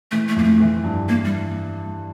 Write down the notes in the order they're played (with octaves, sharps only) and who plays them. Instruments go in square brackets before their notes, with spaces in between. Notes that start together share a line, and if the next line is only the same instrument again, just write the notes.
[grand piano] E3 [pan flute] A3
[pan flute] A3
[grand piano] F2 [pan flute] A#3
[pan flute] A3
[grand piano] E3
G2
[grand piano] E3 [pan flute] A#3
[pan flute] G3